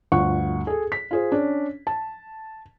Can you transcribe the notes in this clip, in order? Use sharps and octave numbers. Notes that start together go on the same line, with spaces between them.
G1 D2 F4 F#5 C#6
G#4 A4
B6
F4 G#4 C5
C#4 D4
A5